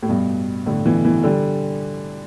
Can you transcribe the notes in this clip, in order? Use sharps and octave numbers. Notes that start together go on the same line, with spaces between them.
A2
G2 B2
A2 D3
B2 E3
B2 E3
D3 G3